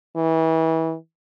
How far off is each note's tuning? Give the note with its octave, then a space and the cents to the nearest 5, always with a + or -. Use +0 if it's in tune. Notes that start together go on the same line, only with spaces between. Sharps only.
E3 -30